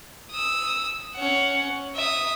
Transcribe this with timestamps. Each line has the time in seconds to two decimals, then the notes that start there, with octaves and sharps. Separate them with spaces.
0.31 D#6 E6
1.15 C#4 F#5
1.95 E5 D#6